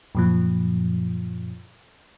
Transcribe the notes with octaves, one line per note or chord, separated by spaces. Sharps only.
F#2 A#2 F3